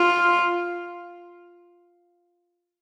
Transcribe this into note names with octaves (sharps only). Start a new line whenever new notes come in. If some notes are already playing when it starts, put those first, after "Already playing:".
Already playing: F4